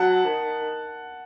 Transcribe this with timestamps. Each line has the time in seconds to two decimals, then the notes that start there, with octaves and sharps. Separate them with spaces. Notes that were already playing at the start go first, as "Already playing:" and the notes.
Already playing: F#3 F#5 A5
0.24 D#3